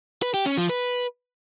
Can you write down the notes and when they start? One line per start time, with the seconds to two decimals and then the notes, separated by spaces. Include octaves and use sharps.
0.22 B4
0.34 G4
0.46 C#4
0.58 F3
0.69 B4